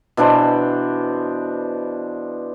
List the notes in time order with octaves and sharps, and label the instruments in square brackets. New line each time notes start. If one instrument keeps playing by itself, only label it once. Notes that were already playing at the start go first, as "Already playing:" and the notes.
[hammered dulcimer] B2 E3 D4 C5